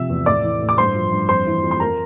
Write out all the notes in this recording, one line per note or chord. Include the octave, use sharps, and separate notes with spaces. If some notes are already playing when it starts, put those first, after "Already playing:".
Already playing: C3 F3 E5 E6
E2
A2 D5 D6
E3
A2
D6
G2 C5 C6
F3
G2
F2 C5 C6
E3
F2
C6
A#4 A#5